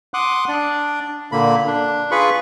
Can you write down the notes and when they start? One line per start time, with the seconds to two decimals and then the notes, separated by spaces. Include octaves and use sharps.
0.14 F#5 C6 D6 D#6 F#6
0.49 D4 D5
1.32 A#2 D3 A#3 B5
1.67 D4
2.11 F4 G#4 B4 B5 C#6